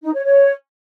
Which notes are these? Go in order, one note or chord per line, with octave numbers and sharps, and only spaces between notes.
D#4
C#5
C#5